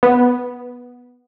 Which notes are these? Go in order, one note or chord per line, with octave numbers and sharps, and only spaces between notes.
B3